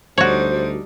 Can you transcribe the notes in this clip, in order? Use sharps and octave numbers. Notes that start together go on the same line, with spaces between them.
D2 G3 D4 D#4 F#4 C5 C#5